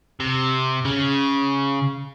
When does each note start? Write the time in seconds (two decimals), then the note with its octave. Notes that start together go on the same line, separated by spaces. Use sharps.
0.20 C3
0.85 C#3